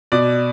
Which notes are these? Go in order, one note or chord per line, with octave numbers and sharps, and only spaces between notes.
B2 D5